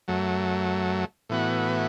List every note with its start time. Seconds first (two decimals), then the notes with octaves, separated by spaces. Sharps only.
0.08 F#2 F#3 A3
1.29 A2 E3 B3 F#4